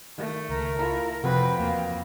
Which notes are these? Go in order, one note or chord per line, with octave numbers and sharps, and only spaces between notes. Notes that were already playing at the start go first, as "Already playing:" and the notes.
D#3 A3
C#2 A#4
E4 F4 A4 A#5
F2 C3 C4 F#4 B4 F5 G5
E2 A3 A#3